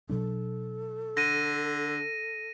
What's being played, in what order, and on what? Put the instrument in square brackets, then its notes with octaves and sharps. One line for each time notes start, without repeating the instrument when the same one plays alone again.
[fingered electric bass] B2 F#3 D4 [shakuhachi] A4
[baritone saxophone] D3 [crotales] A#6 D#7